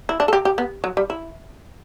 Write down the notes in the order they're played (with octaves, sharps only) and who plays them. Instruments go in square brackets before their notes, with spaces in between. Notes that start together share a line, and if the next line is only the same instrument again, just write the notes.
[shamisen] E4
D4
A4
G4
G4
B3
F#3
G3
E4